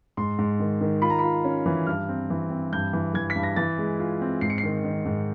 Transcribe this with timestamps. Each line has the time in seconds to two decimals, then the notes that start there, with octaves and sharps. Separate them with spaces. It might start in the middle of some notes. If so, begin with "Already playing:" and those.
0.17 G#2 C6
0.39 G#2
0.60 D#3
0.81 D#3
1.02 F4 B5
1.10 A#5
1.19 F4 B5
1.44 C#4
1.66 E3
1.87 G2 F6
2.09 C4
2.30 E3
2.50 C4
2.73 G2 G6
2.93 E3
3.14 E3 G#6
3.30 B6
3.36 G2
3.43 A#6
3.56 E3 A6
3.78 G#3
4.00 F4
4.21 C4
4.41 G#2 C7
4.50 C#7
4.58 C7
4.63 D#3
4.84 D#3
5.05 G#2